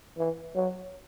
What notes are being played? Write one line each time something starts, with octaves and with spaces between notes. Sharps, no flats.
E3
F#3